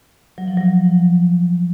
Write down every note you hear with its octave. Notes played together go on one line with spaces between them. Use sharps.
F#3
F3
F#3
F3